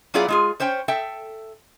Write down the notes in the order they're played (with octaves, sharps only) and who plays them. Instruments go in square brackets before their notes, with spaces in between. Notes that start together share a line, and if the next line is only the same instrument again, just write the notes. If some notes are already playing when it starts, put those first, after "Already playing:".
[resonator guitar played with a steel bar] F#3 B3 E4 F4 G#4 D5
G#3 F4 G#4
C#4 C5 C#5 G5
A4 E5 G5